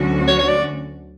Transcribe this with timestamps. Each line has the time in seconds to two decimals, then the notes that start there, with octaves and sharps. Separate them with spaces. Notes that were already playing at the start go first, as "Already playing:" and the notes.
Already playing: D2 D3 F#3 C#4 F#4
0.28 C#5
0.39 C#5
0.48 D5